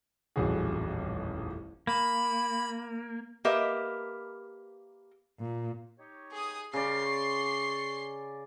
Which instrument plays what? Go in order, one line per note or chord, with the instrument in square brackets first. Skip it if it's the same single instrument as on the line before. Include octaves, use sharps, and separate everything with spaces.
[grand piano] D#1 A1 F2 G3 F#4 G#4
[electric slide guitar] A#3 [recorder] B5
[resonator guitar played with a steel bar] A#3 G4 A#4 B4 D#5 E5
[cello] A#2
[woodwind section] D#4 G4 C#5
[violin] G#4 D#6
[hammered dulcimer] C#3 D5 [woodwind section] G3 G4 A#4 [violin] C6 C7
[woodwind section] C#6